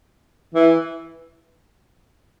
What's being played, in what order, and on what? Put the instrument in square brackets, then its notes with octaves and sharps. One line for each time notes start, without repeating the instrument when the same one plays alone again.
[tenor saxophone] E3